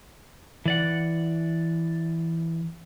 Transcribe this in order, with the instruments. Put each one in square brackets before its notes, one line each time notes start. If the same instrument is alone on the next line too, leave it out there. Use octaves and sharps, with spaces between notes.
[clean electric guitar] E3 D5 F#5